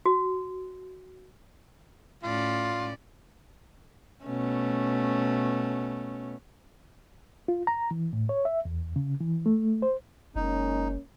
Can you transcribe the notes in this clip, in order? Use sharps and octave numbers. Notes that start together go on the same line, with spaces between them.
F#4
A2 C#4 F4 D5
B2 A3 C#4
F4
A#5
E3
A2
C#5
E5
E2
C#3
E3
A3
C5
F#1 G#3 A#3 C#4 D#4